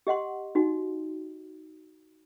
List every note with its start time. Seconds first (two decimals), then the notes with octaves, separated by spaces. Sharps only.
0.07 G4 D#5 F#5 C6
0.55 D#4 F#4